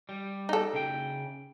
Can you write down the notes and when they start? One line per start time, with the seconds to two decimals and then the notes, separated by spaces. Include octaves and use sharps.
0.09 G3
0.49 D#4 A4
0.73 C#3 G5